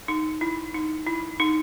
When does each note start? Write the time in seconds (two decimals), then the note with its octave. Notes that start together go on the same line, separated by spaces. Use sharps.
0.08 D#4
0.41 E4
0.75 D#4
1.07 E4
1.40 D#4